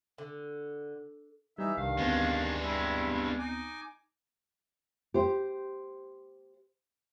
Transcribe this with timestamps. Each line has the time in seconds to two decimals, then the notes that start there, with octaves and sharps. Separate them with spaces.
0.18 D3
1.58 E3 G3 D#4 E5
1.77 C2 G2 D#3 F5
1.98 D2 G#3 B3 C4 D4
2.61 G2 G3 E4
3.39 D#4 G#5 D6
5.14 G4 C5